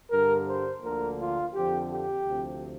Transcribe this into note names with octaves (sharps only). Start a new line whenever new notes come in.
G2 D3 G3 A#4
C5
D2 D3 F3 A#3 A#4
F4
F2 D3 F3 C4 G4
G4
D2 C3 F3 C4